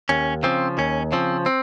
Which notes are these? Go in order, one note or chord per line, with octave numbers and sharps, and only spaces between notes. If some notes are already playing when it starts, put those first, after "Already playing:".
D#2 C#4
C#3 F3 C4
D#2 C#4
C#3 F3 C4
C4